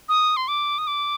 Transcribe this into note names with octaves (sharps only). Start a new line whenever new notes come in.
D#6
C6
D6
D#6
D6